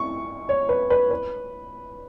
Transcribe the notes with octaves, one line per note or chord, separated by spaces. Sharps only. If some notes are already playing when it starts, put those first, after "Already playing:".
Already playing: C#6
C#5
B4
B4
B4